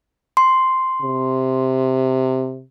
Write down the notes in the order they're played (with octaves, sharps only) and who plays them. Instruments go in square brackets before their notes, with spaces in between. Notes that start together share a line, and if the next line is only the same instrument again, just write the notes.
[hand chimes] C6
[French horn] C3